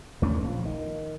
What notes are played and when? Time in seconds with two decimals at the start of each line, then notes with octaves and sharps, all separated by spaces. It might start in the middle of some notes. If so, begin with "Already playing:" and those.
0.22 D#2 A3 C#4 D4
0.43 A#1 F3
0.65 D#3